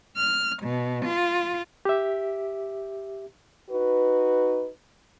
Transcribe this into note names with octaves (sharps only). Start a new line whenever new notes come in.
F6
B2
F4
G4 E5
D#4 F#4 B4